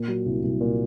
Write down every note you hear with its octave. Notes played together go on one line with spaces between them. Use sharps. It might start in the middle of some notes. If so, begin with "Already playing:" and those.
Already playing: A#2
F#3
C2
C2
A#2